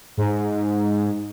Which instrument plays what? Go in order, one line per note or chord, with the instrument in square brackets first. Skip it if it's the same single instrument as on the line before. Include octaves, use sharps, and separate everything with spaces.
[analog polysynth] G#2